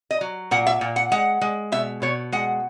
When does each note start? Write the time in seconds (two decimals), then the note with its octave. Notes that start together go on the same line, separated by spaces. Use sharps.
0.11 D#5
0.21 F#3
0.51 A#2 F#5
0.67 E5
0.81 A#2
0.96 F#5
1.12 G#3 F#5
1.41 G#3
1.72 B2 E5
2.02 B2 C#5
2.32 G#3 F#5